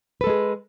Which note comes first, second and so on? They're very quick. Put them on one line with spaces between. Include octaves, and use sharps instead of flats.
B4 A4 G#3 G#4